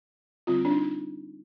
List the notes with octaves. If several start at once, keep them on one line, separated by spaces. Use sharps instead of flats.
D3 G3 C4 F4
D4
D#4